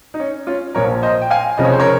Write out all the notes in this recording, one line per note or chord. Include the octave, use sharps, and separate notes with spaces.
D#4
C#4
C#4 F4
A#1 A#2 F3 A#4 C#5
C5 D#5
G5
F5 G#5
F1 F2 C#3 F3 D#5
C#5
C5
A#4 C#5